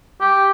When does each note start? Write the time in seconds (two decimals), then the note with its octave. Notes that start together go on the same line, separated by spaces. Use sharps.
0.21 G4